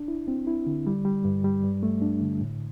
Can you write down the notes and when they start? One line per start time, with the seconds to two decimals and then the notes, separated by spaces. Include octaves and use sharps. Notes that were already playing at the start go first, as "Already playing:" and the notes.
Already playing: D4
0.08 E4
0.28 C4
0.47 E4
0.67 D3
0.87 G3
1.05 G3
1.25 G2
1.44 G3
1.63 G2
1.83 A3
2.02 D4
2.21 D3
2.41 A2